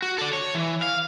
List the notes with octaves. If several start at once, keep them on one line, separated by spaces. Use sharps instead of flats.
F#4
A4 D5
C#5
E3
F5